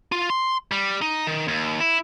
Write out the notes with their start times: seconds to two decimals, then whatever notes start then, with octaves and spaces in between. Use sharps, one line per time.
0.12 F4
0.30 C6
0.72 G3
1.02 D#4
1.27 D#3
1.48 D#2
1.80 E4